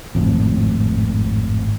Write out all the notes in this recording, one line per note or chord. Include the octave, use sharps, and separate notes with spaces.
G#1 F2 A2